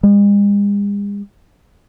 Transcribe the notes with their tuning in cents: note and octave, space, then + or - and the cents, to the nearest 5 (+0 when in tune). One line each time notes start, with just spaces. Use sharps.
G#3 -45